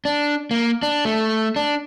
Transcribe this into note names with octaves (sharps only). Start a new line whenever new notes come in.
D4
A#3
D4
A3
D4